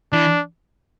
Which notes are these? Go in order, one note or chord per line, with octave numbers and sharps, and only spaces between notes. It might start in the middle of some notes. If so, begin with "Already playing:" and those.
E3 D4